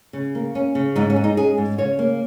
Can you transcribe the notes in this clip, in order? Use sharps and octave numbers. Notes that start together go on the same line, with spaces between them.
C#3
A#3
C#4
C#3
G#2 D#4
C#4
G#3
D#4
C#4 G#4
G#2
C#3 C#5
A#3